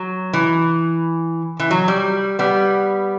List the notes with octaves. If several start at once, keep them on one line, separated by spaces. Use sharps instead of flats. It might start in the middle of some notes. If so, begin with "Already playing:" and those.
Already playing: F#3
E3
E3
F#3
G3
G3 B3